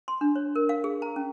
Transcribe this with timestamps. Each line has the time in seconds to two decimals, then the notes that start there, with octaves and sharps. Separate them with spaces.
0.08 C6
0.21 D4
0.36 C#5
0.56 A#4
0.69 F5
0.84 G#4
1.02 A#5
1.16 C#4